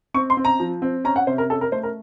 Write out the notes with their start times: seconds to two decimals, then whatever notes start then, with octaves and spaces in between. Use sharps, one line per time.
0.14 C4 C#6
0.30 C6
0.37 C4
0.45 A#5
0.60 F3
0.82 C4
1.04 C#4 A#5
1.16 F#5
1.27 C3 C5
1.38 A#4
1.50 C#4 A4
1.61 A#4
1.72 A3 C5
1.83 A#4